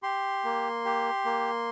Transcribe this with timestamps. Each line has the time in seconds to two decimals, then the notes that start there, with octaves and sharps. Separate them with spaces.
0.03 G4 C6
0.44 A#3
0.85 G4
1.25 A#3